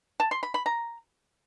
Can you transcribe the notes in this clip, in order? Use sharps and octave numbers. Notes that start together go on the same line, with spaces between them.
A5
C6
B5
B5
A#5